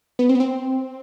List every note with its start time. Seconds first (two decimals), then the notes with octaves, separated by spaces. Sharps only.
0.19 B3
0.29 C4
0.35 B3
0.40 C4